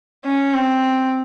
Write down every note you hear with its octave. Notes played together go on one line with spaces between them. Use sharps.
C#4
C4